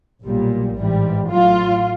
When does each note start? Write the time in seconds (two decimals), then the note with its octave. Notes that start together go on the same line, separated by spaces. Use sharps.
0.24 B1 A#2 G3
0.77 A1 G#2 E3 G3
1.30 A1 A2 F#3 F4